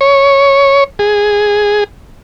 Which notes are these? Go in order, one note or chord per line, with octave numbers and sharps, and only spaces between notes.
C#5
G#4